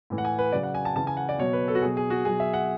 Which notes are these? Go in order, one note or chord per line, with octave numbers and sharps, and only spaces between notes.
A2 E3
F#5
G#5
B4
C#3 F#3 D5
F#5
G#5
A5
C#3 E3 A5
G#5
F#5
D5
B2 F#3 C#5
B4
A4
F#4
B2 F#3 G#4
G#4
F#4
B2 F#3 G#4
E5
F#5